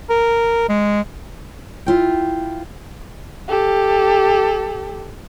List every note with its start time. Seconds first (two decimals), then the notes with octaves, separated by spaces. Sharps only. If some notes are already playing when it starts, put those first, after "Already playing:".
0.09 A#4
0.69 G#3
1.86 E4 F4 G5
3.48 G4 A4